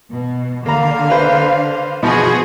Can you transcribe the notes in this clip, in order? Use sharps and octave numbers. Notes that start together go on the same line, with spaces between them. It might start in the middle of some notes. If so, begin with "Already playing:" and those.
B2
D3 A#3 F5 A#5
B4 C5
B2 F3 B3 F#4 G#4